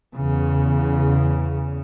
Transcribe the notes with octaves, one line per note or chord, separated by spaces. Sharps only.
E2 C#3